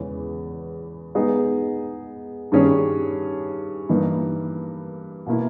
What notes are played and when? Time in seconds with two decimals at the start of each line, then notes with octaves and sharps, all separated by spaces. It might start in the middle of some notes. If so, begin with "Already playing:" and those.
Already playing: E2 C#3 E3 G#3 C#4
1.15 G#3 B3 D#4 G#4 D#5
2.52 G2 D#3 G3 C#4 G#4
3.89 G2 E3 A#3 D#4
5.26 B2 A#3 E4